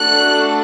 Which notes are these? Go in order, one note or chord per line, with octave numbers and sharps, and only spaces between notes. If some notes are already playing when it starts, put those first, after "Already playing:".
Already playing: A3 D4 F#4 A4 F#6